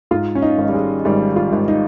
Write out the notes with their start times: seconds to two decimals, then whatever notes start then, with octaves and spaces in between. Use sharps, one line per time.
0.11 G#2 F4
0.35 C#4
0.42 D#4
0.58 G#1
0.69 G3
0.74 G#3
1.05 G#1 G3
1.36 F4
1.53 G#1
1.68 D#4